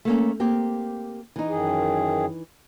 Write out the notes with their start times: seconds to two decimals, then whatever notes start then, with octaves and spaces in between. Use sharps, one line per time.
0.05 A3 A#3 C#4
0.40 A#3 C4 G4
1.36 E3 D#4
1.49 F#2 D#3 G#4